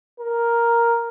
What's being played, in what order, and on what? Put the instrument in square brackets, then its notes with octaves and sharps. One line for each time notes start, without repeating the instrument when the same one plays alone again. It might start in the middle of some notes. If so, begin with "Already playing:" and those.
[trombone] A#4